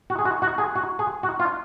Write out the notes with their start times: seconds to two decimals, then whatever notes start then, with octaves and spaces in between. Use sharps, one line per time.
0.10 F#4
0.19 G#4
0.25 F#4
0.42 F#4
0.58 G#4
0.75 F#4
0.99 G#4
1.23 F#4
1.40 F4